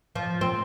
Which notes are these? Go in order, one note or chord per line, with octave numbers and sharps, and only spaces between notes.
F3
C4